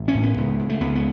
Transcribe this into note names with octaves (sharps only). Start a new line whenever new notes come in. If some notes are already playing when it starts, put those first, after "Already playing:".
Already playing: A1
C#4
A2
B3
C#2
C#2
A3
C#2 B3
B3